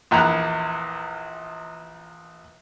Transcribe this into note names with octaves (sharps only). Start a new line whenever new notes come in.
A#1 E2 A#5 F#6